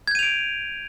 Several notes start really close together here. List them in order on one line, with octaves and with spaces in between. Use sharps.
G#6 G6 D#7 F7 D7